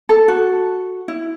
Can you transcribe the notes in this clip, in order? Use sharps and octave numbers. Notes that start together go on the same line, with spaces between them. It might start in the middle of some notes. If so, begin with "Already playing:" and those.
A4
F#4
E4